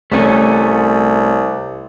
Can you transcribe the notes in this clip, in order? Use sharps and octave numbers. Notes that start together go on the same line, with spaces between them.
C2 A3 C#4